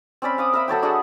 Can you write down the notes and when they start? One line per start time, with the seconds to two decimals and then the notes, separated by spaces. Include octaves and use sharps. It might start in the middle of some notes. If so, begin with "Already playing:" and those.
0.22 C4 C#4 D5 B5
0.38 F5 D6 D#6
0.53 A#4 E5 B5
0.68 F#3 A4 C#5 G5
0.82 D4 F#4 G#4 D#5